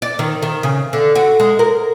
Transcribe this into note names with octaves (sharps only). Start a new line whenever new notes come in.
D5
D#3
D#3
C#3
D3
F#4
G#3
A#4